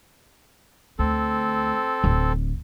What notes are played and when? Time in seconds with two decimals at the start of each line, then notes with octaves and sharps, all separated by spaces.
0.99 D2 C4 A4
2.04 D1